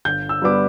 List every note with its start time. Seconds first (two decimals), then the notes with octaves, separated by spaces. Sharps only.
0.05 G1 G6
0.29 E6
0.42 G2 G3 B3 D6